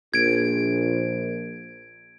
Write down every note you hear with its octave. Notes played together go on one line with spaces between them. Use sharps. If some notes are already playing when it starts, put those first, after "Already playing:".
A#1 G#6 D7